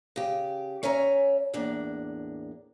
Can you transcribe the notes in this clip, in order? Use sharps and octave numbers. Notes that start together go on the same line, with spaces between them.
C#3 G4
C#4 C#5 E5 G#5 A#5
E2 A2 A#3 D4